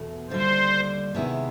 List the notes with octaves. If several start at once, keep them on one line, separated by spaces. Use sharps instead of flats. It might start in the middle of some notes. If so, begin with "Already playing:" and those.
Already playing: E2 B2 A3
D#2 D3 G3 C5
C3 D#3 G#3 B3 E4